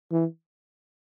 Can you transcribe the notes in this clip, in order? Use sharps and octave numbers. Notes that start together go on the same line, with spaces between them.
E3